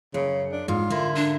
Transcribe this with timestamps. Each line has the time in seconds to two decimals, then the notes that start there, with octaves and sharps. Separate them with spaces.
0.14 F#2 C#3
0.52 D4
0.68 G#2 F4
0.90 D3 E4 A#4
1.16 D4